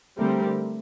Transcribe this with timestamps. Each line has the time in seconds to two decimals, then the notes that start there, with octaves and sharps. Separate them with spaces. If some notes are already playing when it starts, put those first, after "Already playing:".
0.18 D3 G3 A3 C4 G4 A#4